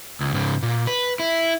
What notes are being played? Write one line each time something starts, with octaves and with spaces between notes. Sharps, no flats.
C#2
G#2 C#3
A#2
B4
E4